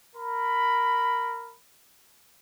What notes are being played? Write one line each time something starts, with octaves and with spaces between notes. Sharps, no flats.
A#4 B5